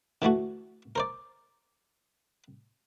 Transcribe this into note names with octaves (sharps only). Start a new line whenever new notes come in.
D3 E3 A3 F#4
A#4 C5 D5